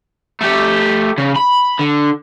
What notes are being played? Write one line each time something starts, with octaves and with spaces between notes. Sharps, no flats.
A3 G4
C#3
B5
D3